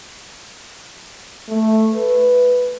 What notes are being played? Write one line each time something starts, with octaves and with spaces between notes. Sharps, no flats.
A3
B4